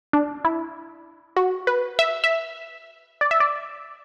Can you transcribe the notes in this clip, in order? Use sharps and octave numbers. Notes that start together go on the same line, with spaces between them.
D4
E4
F#4
B4
E5
E5
D5
E5
D5